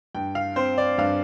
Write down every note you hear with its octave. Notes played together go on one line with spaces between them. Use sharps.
G2 G5
F5
C4 C5
D5
G2 F5